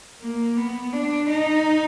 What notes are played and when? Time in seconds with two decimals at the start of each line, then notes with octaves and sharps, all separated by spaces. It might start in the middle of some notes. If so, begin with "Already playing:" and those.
0.21 A#3
0.57 B3
0.93 D4
1.30 D#4